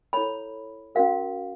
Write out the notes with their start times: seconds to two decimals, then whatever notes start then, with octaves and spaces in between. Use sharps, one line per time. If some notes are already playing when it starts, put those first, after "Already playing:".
0.13 E4 A4 C#5 B5
0.95 C#4 F#4 A#4 F5